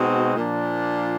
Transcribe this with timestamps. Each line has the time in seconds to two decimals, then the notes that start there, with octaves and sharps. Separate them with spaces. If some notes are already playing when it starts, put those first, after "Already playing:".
Already playing: B2 G#3 C4 D#4 F#4
0.35 A#2 F3 A#3 D4 F4